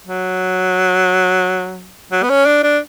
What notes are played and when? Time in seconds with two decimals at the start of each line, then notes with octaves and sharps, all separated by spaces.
0.07 F#3
2.13 F#3
2.23 B3
2.30 C#4
2.46 D4
2.63 D4